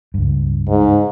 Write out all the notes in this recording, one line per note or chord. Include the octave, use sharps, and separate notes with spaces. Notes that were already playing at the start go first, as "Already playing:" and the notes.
C#2 G2
G#2